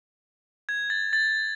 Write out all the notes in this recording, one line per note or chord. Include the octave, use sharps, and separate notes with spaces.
G#6
A6
A6